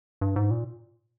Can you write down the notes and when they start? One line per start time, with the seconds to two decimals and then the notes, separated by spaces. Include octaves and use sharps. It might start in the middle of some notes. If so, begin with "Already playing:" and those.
0.21 G2
0.36 G#2
0.50 A#2